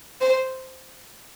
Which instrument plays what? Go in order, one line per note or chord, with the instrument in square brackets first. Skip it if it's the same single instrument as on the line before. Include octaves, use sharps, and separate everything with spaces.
[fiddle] C5